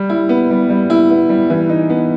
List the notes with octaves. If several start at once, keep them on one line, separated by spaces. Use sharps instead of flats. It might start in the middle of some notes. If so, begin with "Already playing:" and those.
Already playing: G3
E4
B3
G3
G3
E4
B3
G3
E3
D#4
B3